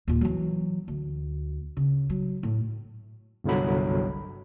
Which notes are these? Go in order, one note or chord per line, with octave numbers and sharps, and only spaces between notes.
D#2 A#2
E3 F#3
D2
C#3
F#3
A2
G1 C2 D3 F#3 B5